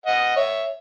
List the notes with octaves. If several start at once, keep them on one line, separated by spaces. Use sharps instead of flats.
D#5 F#5
C#5 E5